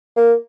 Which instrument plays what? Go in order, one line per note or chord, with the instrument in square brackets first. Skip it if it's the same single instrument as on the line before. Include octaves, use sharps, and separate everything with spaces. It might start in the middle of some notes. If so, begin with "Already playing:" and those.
[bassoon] A#3